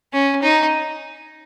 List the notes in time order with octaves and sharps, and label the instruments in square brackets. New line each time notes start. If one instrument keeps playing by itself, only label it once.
[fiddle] C#4
D#4